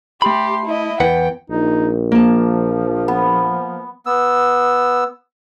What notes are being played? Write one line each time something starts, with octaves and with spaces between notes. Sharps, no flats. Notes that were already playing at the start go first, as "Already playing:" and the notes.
A3 G4 B5 C6
E4 D#5
E2 B4 F#5 G5
A#1 D#4
F3 A#3 A5
B3
B3 E6